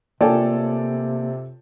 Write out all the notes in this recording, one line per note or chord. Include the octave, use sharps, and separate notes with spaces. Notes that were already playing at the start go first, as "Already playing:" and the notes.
C3 A#3 F4 A4 C#5 D5 G5 G#5